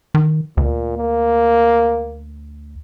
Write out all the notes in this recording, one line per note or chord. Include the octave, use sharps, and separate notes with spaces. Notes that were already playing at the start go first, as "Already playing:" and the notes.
D#3
D2 A#2
A#3